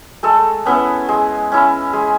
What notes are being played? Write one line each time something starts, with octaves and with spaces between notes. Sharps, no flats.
G#3 A3 A4
B3 C#4 E4 B4
G#3
C#4 E4
G#3